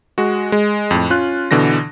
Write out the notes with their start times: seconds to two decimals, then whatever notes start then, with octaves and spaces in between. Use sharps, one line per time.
0.18 G#3 F#4
0.52 G#3
0.91 F2 A2
1.10 C#4 F4 F#6
1.51 B2 D3 E3 A#6